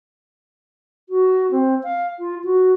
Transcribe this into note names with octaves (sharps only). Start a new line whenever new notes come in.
F#4
C4
F5
F4
F#4